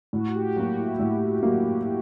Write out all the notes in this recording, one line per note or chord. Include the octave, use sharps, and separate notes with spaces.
A2 F#4
G4
F#3 A#3 F#4
E4
A2
F#3 A#3